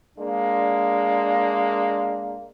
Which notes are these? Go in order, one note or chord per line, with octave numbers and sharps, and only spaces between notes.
G#3 A#3 D4